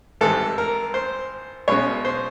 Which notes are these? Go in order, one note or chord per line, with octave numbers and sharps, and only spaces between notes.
G#1 G#2 E3 G3 A4
A#4
C5
B1 B2 G#3 C#4 C#5
C5